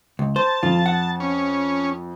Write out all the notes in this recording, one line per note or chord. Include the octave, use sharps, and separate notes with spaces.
C#2
C5 A5
F2 F4
F#5
C#4